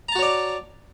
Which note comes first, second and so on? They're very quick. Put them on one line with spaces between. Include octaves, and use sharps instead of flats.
A#5 A5 F#4 C#5 D5